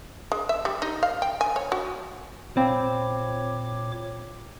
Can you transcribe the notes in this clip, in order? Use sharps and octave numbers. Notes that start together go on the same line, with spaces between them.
G#3
E5
G3
D#4
F5
G5
G#5
C#5
F#4
A#2 C4 C#5 F5 G5 B5 D6